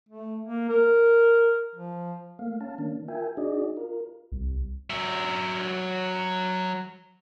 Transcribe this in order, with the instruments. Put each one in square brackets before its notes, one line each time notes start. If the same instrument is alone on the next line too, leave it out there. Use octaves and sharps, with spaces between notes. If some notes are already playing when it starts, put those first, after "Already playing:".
[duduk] A3
A#3
A#4
F3
[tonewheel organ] A3 A#3 F5
C#4 F5 A5
D#3 A#3 C#4 D4
F4 A#4 E5 G5 G#5
D4 D#4 F#4 G#4 D5 D#5
F4 A#4
[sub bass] C2
[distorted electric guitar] F#3 E5